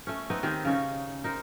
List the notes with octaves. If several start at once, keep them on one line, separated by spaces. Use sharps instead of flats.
A3 C#4
B3 C4 D#4
D#3 C4 G4 G#4
C#3 C#4 D#4
D#4 A#4 C5